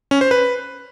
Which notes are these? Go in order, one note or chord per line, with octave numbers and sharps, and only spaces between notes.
C#4
C5
B4